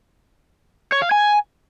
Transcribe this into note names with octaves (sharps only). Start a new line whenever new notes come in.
C#5
F5
G#5